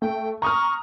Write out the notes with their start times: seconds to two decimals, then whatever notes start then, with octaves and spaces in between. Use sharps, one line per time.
0.02 A3 G5
0.42 A#5 C#6 D#6 F6